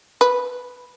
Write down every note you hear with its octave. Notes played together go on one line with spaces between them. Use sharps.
B4